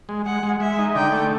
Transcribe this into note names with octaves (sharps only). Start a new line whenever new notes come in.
G#3
G#3 F#5
G#3
G#3 E5
D#4
D3 G5
A3